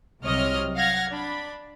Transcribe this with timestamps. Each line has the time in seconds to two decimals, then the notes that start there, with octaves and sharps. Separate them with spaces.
0.21 C2 C3 F#3 C#5 D#5 F6
0.76 F5 F#5 F6 G#6 A#6
1.09 D4 B5